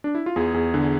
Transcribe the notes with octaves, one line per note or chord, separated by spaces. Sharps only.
D4
E4
F4
E2 G#4
E2 G#4
D3